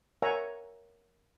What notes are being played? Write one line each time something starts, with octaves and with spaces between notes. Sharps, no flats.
A#4 C#5 E5 F#5 G#5 A#5